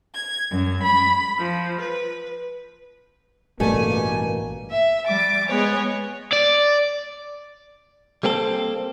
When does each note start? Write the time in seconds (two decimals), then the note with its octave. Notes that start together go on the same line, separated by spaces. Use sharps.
0.14 G#6
0.52 F#2
0.83 B5
1.38 F3
1.80 B4
3.60 A1 G2 B2 G3 A3 A#3 G#5
4.71 E5
5.06 G3 D6 A6
5.48 G#3 B3 G#4 C#5
6.33 D5
8.23 G3 A#3 C4 G#4 A4